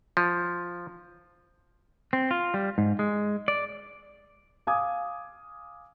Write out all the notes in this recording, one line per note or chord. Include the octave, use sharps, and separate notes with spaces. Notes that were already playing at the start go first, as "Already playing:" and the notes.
F3
C4
F4
G3
G#2
G#3
D5
F5 G#5 D6 D#6 G#6